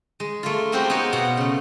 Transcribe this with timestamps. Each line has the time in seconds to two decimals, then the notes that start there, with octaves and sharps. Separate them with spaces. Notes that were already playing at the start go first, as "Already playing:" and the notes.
0.20 G#3
0.43 A3 A#3 F4
0.72 G#3 A#3 C4 E4 F#4 G4
0.90 B3 D#4 F#4 A#4 C#5
1.13 B2 F4 F#5
1.37 C#3 A3